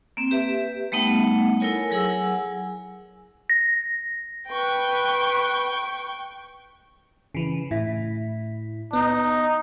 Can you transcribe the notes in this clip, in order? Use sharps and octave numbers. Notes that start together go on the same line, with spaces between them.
A#3 C4
G4 B4 E5
G3 A3 B3 D#4 F#5
E4 A4 A#4 C#5 G#5
F#3 G#4 F#5 G#5 E6
A#6
B4 G5 C#6
C#3 E3
A2 E4
B3 D#4